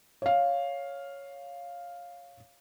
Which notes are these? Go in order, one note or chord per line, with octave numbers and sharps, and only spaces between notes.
C#5 F5